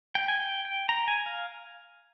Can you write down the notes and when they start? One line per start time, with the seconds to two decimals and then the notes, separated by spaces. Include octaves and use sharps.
0.15 G5
0.28 G#5
0.40 G5
0.65 G5
0.89 A#5
1.08 G#5
1.26 F5